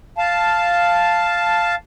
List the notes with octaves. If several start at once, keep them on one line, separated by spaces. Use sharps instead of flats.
F5 A5